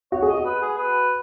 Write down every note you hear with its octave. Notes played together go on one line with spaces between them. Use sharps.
F#4 C#5
G#4
F#4 D#5
B4
G#4
B4